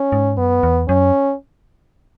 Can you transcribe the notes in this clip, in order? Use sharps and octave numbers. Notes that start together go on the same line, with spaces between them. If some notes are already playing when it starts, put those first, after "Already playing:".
Already playing: C#4
G#2
F#2 B3
E2
F#2 C#4